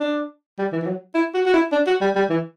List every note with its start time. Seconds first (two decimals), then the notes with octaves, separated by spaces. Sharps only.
0.01 D4
0.59 G3
0.72 E3
0.82 E3
0.87 F#3
1.15 E4
1.35 F#4
1.46 F#4
1.54 E4
1.72 D4
1.87 F#4
2.01 G3
2.16 G3
2.30 E3